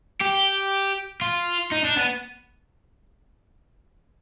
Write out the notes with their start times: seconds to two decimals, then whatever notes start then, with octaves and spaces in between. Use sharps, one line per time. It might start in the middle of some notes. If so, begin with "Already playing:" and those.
0.21 G4
1.22 F4
1.72 D#4
1.85 D4
1.97 B3